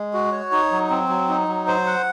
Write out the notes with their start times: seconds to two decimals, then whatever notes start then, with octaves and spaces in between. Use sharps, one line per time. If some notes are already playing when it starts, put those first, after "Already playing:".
Already playing: G#3
0.13 F#4
0.32 C#5
0.52 D#4
0.71 F#3
0.90 C4
1.09 F#3
1.29 D#4
1.48 F#3
1.67 C5
1.86 F#5